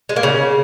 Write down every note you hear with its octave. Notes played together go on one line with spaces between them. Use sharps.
G#3
A#3
C#3